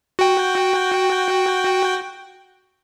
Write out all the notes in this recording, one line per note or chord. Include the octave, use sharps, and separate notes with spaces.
F#4 G5